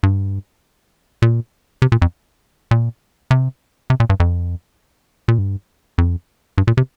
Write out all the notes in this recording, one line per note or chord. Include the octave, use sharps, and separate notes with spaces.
G2
A#2
C3
A#2
F2
A#2
C3
C3
A#2
G2
F2
A#2
G2
F2
G2
A#2
C3